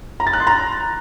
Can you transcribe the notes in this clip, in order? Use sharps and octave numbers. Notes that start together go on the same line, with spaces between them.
A#5
A6
F#6
C6
A#5